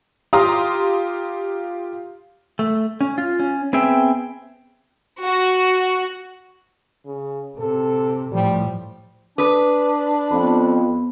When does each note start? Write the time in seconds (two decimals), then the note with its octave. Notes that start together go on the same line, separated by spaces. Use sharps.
0.33 F4 G4 A#5 C6 D#6
2.59 A3
3.01 C#4
3.18 F4
3.40 C#4
3.73 B3 C4 G#4 E5 G5
5.22 F#4
7.06 C#3
7.58 C3 A4
8.32 A2 F3 G3
9.38 D4 B4 D6 D#6
10.31 F2 B3 B5